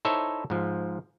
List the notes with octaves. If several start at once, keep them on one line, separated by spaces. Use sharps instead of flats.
D#4 E4 A4 C5 C#5 E5
G#2 F3